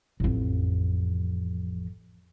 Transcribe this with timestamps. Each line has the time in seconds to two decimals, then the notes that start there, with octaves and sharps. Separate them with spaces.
0.20 A1 F2